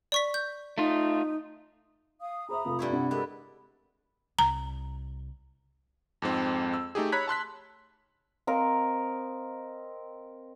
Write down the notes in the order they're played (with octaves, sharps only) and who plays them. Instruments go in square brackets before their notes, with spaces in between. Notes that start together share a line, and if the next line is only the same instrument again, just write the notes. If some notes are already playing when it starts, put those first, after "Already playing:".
[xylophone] D5 C#6 B6
G6
[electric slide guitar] A3 F4 [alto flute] D#4
[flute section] F5 D#6
[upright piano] G#4 C5 E5 [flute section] A#5 B5 D#6
[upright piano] F1 F4
[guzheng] G2 E4 C#5
[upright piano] C3 D4 [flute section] F#5
[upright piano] G#3 [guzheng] B3 [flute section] G4 A4 A#4
[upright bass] C2 [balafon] A#5
[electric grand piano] F2 G#2 C4
E6
A3 D#4 G4 G#4
C#5 A#5 B5 F#6 G#6 B6
A5 C6 F#6 B6
[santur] C4 A#4 D#5 F5